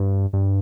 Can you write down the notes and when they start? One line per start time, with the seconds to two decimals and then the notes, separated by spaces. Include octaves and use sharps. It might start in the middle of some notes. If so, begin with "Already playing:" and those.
Already playing: G2
0.33 G2